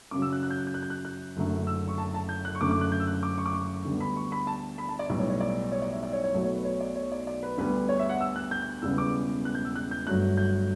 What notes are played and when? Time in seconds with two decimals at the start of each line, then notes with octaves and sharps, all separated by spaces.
0.11 F#2 C#3 F#3 D6
0.22 E6
0.33 F#6
0.43 F#6
0.50 G6
0.58 F#6
0.67 G6
0.74 F#6
0.83 G6
0.90 F#6
1.05 F#6
1.36 F#1 F#2 D3 A3
1.67 E6
1.88 C#6
1.98 A5
2.14 A5
2.29 G6
2.45 F#6
2.55 C#6
2.61 F#1 F#2 D3 A3 D6
2.71 D6
2.81 F#6
2.92 G6
3.00 E6
3.07 F#6
3.23 D6
3.38 C#6
3.46 D6
3.53 C#6
3.85 D2 D3 G3 B3
4.00 B5
4.16 C#6
4.32 B5
4.47 A5
4.78 B5
4.89 A5
4.99 D5
5.09 B1 A2 G3 B3 D5
5.20 C#5
5.30 C#5
5.40 D5
5.72 C#5
5.82 D5
5.92 E5
6.03 D5
6.13 C#5
6.24 C#5
6.34 B1 B2 F#3 A3
6.44 C#5
6.54 B4
6.65 C#5
6.80 D5
6.96 C#5
7.12 D5
7.27 D5
7.43 B4
7.58 D2 D3 G3 B3 B4
7.89 C#5
7.99 E5
8.09 F#5
8.21 E6
8.36 F#6
8.51 G6
8.62 G6
8.82 E1 E2 C#3 G3 B3 E6
8.98 D6
9.45 F#6
9.55 G6
9.65 E6
9.76 F#6
9.91 G6
10.07 G1 G2 F#3 A3 F#6
10.37 G6